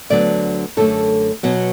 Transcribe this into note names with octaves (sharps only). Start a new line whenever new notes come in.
D2 D3 F#3 B3 D5
F#2 D3 A3 A4
B2 F#3 B3 F#4